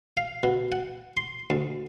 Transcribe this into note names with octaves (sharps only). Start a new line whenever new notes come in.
F5
B2
F#5
C6
D2